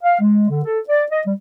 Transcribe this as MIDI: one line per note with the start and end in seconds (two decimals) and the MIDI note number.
0.02 0.19 77
0.19 0.49 56
0.49 0.61 50
0.64 0.79 69
0.89 1.04 74
1.11 1.20 75
1.26 1.34 55